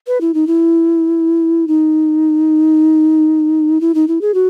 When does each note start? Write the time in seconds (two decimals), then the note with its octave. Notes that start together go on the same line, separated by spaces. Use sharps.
0.07 B4
0.21 E4
0.34 D#4
0.47 E4
1.68 D#4
3.81 E4
3.95 D#4
4.08 E4
4.21 G#4
4.34 F#4